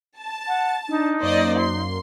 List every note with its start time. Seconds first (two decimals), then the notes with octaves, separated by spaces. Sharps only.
0.18 A5
0.48 F#5
0.89 D4 D#4
1.20 F#2 A#3 C5 D5 D#5
1.59 C6